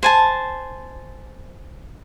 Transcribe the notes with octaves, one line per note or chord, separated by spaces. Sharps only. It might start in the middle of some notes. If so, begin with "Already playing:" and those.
C5 G#5 A5